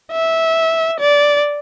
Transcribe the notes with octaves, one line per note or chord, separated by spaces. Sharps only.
E5
D5